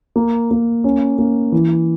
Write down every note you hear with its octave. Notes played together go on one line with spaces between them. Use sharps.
A#3
A#3
C#4
A#3
E3